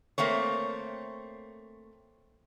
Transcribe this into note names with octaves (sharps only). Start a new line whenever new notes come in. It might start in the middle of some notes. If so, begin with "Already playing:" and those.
A3 A#3 C4 C#5